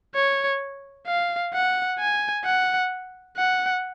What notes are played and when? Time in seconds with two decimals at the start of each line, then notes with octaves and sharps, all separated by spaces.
0.15 C#5
1.07 F5
1.54 F#5
1.99 G#5
2.45 F#5
3.37 F#5